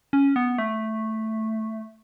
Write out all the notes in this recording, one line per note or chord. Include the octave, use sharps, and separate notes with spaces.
C#4
B3
A3